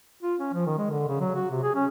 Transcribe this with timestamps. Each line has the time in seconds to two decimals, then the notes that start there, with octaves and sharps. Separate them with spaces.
0.23 F4
0.39 C#4
0.53 F3
0.66 D#3
0.78 G#3
0.90 D3
1.08 C#3
1.20 F#3
1.35 F#4
1.50 C3
1.63 G#4
1.75 C#4